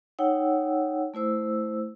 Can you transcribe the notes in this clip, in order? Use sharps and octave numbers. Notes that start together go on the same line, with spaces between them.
D#4 C#5 F#5 G5 E6
A3 E4 C5 E6